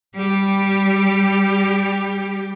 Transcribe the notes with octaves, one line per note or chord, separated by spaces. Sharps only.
G3 G4